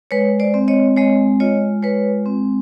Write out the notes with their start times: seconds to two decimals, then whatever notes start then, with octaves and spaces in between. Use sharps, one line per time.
0.11 G#3 B4 C#5
0.40 C5 D5
0.54 C4
0.68 C#5 D#5
0.97 G#3 C#5 D#5
1.40 F4 C#5 D#5
1.83 G#3 B4 C#5
2.26 C4